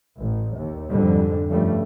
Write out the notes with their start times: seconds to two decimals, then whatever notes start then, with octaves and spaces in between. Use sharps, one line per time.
0.20 A1
0.57 D#2
0.89 F2 G#2 D3 G3
1.50 G2 C#3 F3 G3 A3